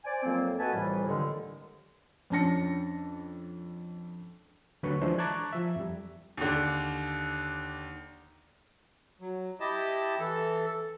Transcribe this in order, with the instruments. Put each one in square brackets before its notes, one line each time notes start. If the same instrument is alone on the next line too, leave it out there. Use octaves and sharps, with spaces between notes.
[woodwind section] C5 D5 G#5
F2 D#3 F#3 A#3 C4
A3 F#4 B4 D#5 G#5 A5
C2 F2 A2 E3 G3
G2 A#2 D3 D#3 F#3 G#3
[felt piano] F2 C#4 D4 A5 A#6 C#7
[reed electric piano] D2 D3 F#3 B4 C#6
E3 F3 G#3 D4 E4 C5
A5 A#5 C#6 D6 F#6 G#6
F3 E5
F2 G3
[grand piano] D#2 D3
[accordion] F#3
E4 G4 D#5 A5
E3 A4